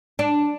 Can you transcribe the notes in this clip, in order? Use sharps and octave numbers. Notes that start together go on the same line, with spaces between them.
D4